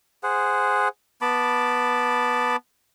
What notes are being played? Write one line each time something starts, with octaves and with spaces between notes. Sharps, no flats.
G#4 C5 F#5
B3 A5 B5 D6